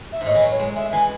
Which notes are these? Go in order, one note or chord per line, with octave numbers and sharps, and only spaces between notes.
E5
G#2
A2 D#5
E3
F#3
C#5
G#3
G#3 E5
E3 G#5